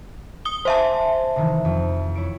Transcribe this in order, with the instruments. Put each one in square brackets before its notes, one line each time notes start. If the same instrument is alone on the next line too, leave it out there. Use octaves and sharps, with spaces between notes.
[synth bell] D#6 G7
[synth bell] C5 E5 A5 [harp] F5 G#5 C6
[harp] C3 D#3 E3
F2
E4 C#5 D7